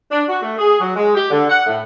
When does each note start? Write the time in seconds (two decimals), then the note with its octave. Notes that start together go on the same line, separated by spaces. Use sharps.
0.11 D4
0.29 F#4
0.43 A3
0.58 G#4
0.80 F#3
0.96 G#3
1.15 G4
1.30 D3
1.50 F#5
1.66 A2